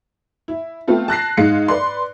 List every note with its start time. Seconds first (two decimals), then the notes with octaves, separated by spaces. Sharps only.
0.48 E4
0.88 A3 B3 C4 F4 A4
1.08 A5 F#6 A#6 C7
1.37 G#2 G#3 D#4 F5 C#7
1.68 B4 D5 C6